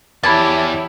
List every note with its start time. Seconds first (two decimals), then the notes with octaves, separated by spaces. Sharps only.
0.23 E2 E4 G4 C#5 A5 B5 G#6 A6